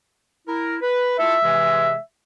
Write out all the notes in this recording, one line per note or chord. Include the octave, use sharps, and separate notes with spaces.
E4 A#4
B4
E4 F4 A4 E5
C3 E3 G#3